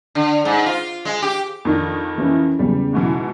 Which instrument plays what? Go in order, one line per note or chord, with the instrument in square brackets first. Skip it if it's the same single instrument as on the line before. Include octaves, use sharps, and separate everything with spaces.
[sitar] D3
G#2
F4
G#3
G4
[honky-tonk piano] F2 D#3 D#4 [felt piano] D4
[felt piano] E3 C#4 E4
[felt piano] E2 C#3 [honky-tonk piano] G3
[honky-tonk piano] G#2 B2 E3